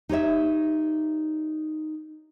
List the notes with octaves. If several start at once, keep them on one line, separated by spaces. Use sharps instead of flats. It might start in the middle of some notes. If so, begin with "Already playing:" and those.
D#4 G4 C#5 E5